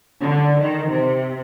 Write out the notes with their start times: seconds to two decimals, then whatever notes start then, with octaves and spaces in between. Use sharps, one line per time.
0.21 D3
0.61 D#3
0.89 C3